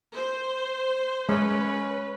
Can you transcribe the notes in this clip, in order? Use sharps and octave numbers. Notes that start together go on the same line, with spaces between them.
C5
G#3 C#4 B4